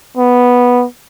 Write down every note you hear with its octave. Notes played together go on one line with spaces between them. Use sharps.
B3